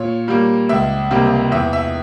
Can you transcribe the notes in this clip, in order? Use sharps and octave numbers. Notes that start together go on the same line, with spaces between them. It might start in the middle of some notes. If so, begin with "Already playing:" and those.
Already playing: A#2 C#5
G3 A#3
C#2 E5
C3 G3 A#3
E2 E5
E5